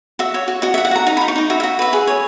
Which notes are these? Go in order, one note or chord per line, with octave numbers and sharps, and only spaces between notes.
F#4 E5
C#5
F#4
F#4 D#5
E5
F#4
F#5
F#4 A#5
D#4 A#5
B5
D#4
C#6
D#4 D#5
F#4 E5
E5
F#4
B4 E5
G#4
C#5